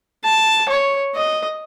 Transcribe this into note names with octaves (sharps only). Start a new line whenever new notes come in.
A5
C#5
D#5